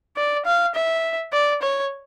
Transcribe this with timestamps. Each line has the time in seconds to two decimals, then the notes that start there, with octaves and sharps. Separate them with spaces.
0.17 D5
0.46 F5
0.75 E5
1.33 D5
1.62 C#5